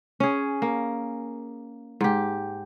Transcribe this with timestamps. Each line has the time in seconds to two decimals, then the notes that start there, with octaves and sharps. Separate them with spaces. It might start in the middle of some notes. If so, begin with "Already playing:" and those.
0.20 C#4 G#4
0.62 A#3
2.01 G#2 G4